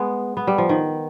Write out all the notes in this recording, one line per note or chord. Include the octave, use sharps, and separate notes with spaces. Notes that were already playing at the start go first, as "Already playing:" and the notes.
Already playing: G#3 B3
B3
G3
F3
D#3